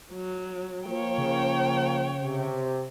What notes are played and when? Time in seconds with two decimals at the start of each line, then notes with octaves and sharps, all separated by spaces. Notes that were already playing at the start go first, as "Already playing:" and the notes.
0.13 F#3
0.88 F3 A#3 C#5 G5
1.18 C#3
2.23 C3